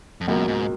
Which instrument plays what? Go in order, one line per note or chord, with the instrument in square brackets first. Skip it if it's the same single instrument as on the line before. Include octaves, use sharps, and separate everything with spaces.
[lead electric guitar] F2
[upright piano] C#2 B2 F#3 A#3 [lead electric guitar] F#2
[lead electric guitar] G#2